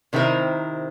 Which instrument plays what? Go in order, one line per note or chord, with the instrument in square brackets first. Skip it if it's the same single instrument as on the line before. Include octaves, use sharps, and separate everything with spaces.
[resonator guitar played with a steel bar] C3 D#3 C4 E4 A#4